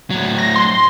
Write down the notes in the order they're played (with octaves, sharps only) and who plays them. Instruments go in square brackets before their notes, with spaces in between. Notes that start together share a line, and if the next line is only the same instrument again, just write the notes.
[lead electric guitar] A2 F#3
[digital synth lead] A#6
C6